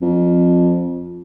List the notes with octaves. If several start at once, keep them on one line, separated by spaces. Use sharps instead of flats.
F2